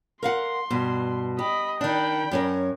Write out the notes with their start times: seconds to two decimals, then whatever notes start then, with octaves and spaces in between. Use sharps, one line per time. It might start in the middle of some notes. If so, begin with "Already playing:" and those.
0.23 A#4 F5 F#5 C6
0.70 G2 B2
1.39 G4 D#5 B5
1.81 D#3 D4 G5 B5
2.31 F#2 C#4 A#4